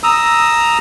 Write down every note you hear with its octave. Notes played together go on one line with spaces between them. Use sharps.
A#5 D#6 E6